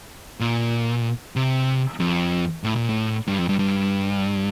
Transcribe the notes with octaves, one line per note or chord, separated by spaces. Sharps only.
A#2
C3
F2
A2
A#2
A2
G2
F2
G2
G2